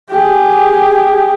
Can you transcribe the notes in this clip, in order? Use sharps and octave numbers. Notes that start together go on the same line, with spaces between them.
G4 G#4